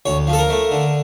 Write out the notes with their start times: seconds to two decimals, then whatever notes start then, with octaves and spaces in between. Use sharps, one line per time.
0.06 D2 C#5
0.27 F3
0.33 A4
0.39 A#4
0.50 A3
0.71 D3